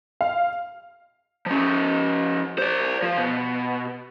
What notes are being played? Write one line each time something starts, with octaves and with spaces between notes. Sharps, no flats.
F5
F3 C#4
C5 D5
F3
B2